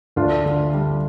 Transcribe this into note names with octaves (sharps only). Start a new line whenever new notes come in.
D2 D4 F4
D3
G3